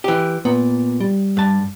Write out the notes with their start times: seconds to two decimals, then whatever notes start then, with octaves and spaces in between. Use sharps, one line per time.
0.04 E3 G4
0.45 A#2 B3
1.00 G3
1.37 G2 A5